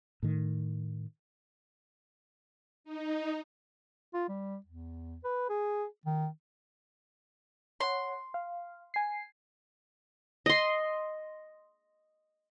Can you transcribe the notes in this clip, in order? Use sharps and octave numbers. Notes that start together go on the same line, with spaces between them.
A2 D#3
D#4
F4
G3
E2
B4
G#4
D#3
C#5 F#5 C6
F5
G#5 C7
D#5 C6